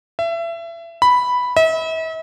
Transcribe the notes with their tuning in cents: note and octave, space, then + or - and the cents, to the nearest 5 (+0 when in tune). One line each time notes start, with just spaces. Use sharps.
E5 +30
B5 +0
E5 -40